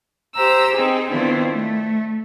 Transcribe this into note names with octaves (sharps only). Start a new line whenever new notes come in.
G4 C5 A#5 E6
C4 D#4 G#4
D#3 B3 C4 D4 E4 F4
A3